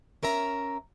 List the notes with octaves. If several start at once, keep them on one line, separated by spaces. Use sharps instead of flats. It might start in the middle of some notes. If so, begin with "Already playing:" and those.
C#4 A#4 E5 A#5